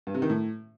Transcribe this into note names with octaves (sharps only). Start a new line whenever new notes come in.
G2
C3
D#3
A2